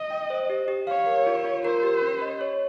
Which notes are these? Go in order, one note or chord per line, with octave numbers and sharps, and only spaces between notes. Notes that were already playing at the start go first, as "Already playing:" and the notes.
Already playing: D#5
G5
C5
G4
G4
C#5 F5
A#4
F4
F4
A#4 C5
G4
C#4
D#5
C#5